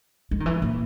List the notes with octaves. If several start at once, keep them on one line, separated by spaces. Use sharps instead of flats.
G#3
D#3
E3
A#2